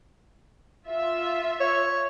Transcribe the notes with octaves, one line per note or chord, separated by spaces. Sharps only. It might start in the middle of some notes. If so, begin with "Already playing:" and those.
F4 E5
C#5